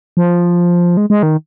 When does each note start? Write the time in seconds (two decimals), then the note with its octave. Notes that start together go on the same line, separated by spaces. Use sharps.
0.17 F3
0.97 G#3
1.10 G#3
1.23 D#3